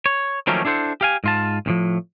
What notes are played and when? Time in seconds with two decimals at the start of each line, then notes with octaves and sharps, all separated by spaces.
0.06 C#5
0.47 D#3 F3 F#3 A3 A#3 C#4
0.65 D4 E4 A4 C5 F#5
1.01 G4 F5 G#5
1.24 G#2 F4 A5
1.66 C2 A2 F3